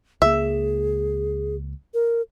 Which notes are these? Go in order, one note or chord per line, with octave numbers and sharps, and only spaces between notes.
C#2 A#3 G#4 E5
A#4